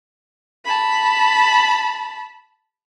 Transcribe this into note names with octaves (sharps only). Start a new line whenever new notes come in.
A5 B5